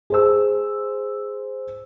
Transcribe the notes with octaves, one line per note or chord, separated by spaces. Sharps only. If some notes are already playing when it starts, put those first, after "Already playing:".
G#4 C5 E6